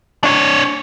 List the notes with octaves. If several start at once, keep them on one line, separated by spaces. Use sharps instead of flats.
D4 C#5